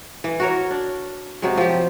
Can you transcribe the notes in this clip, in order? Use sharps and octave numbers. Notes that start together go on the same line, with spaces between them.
E3
F#4 A#4 C#5
D4
C3 F#3 G#3
F3 G4